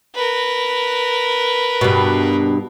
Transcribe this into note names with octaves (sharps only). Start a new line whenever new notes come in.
A#4 B4
G2 B2